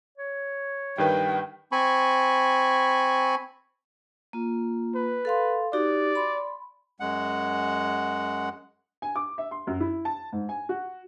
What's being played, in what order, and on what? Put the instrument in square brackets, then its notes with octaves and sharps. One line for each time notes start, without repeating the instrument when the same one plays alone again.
[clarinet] C#5
[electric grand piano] G2 D#3 B4 [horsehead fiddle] G5
[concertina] C4 G#5 B5 C#6
[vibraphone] A#3 F4
[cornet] B4
[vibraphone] A4 F5 C6
[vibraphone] D#4 F#4 G4 [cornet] D5
[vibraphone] B5 C6
[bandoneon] F#2 G#3 F#5
[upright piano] G#5
D6
E5
C6
F#2
E4
A5
G#2
G#5
F#4